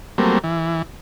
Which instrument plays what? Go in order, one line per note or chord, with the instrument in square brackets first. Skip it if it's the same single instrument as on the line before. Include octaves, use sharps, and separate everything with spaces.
[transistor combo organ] F#3 G3 A3 A#3 C4
E3